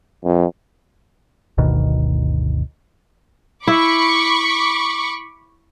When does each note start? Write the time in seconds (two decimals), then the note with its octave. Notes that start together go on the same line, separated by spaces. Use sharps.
0.24 F2
1.58 G1 D2 B2 D#3
3.67 E4 B5 C#6 D6